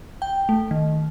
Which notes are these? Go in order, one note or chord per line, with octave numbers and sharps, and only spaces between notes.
G5
A3
D#3